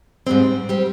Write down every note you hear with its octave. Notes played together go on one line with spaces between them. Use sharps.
G#2 G3 C4
G3 C4